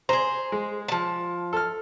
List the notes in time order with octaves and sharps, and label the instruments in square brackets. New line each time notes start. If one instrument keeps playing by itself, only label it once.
[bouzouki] G#4 C5 [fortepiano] A#5
[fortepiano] G#3
[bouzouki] F3 A5
[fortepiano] A4 F6